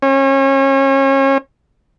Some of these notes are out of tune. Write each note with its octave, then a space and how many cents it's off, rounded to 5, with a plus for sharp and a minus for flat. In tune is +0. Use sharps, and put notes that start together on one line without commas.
C#4 -35